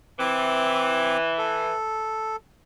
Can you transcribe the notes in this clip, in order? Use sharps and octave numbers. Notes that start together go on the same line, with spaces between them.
E3 C4 D6
A4